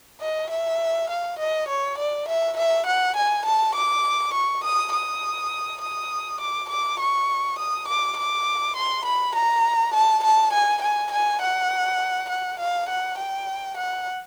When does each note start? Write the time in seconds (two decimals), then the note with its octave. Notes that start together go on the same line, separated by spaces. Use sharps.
0.21 D#5
0.51 E5
1.10 F5
1.39 D#5
1.69 C#5
1.98 D5
2.28 E5
2.57 E5
2.87 F#5
3.16 G#5
3.46 A5
3.75 D6
4.34 C#6
4.64 D#6
4.93 D#6
5.81 D#6
6.40 D6
6.70 D6
7.00 C#6
7.59 D#6
7.88 D6
8.17 D6
8.76 C6
9.06 B5
9.35 A#5
9.94 A5
10.24 A5
10.53 G#5
10.82 G#5
11.12 G#5
11.42 F#5
12.30 F#5
12.60 F5
12.89 F#5
13.18 G5
13.77 F#5